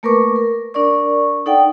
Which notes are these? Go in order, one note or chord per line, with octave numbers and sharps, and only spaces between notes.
A3 A#3 A#4 B4 C#6 D6
A#4
D4 A#4 D5 C#6
D#4 A4 D5 F#5 G5